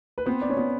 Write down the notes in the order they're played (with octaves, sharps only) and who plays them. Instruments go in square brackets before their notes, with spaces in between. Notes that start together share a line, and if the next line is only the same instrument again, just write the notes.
[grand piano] B4
[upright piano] B3 [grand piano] C4 C5
[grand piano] D5
C#4 C#5
[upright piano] B3